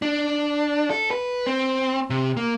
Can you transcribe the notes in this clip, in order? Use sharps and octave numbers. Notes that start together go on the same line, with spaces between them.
D4
A4
B4
C4
C3
A#3